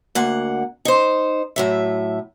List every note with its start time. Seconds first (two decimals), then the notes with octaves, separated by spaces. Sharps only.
0.15 D2 A#3 F#5
0.85 D#4 C5
1.56 A2 F#3 E5